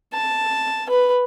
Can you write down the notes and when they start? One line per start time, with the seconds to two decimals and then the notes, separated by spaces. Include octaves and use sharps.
0.14 A5
0.90 B4